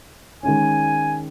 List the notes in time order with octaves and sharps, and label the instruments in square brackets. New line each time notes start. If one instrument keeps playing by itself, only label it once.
[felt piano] D#3 G#3 C#4 [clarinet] G#5